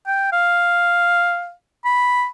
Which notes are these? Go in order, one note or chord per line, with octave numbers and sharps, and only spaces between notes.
G5
F5
B5